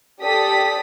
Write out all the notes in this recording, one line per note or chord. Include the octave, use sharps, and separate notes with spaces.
G4 A4 D5 D#6 B6